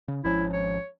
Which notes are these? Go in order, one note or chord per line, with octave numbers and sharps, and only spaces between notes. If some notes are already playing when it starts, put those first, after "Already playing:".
C#3
G#1 F3 C#4 E4
C#5